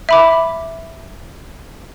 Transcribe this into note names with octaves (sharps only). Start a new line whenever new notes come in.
E5 B5 D6